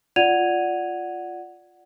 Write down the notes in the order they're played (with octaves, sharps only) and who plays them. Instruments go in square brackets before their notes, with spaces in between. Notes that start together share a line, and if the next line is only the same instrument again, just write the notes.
[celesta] F4 D5 F#5 G#6 D#7 F7